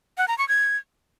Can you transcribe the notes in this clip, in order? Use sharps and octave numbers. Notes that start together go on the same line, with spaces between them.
F#5
A#5
C#6
G#6